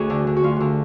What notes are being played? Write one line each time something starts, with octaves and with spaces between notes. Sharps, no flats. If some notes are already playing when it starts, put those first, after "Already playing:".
Already playing: D2 F#4 G#4
D3
D3
F#4
D2 F4
D3 F#4